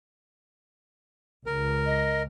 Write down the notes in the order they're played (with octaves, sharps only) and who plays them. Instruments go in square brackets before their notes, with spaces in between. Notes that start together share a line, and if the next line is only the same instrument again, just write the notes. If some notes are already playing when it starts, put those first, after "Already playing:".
[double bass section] C#2 [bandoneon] A#4
[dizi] D#5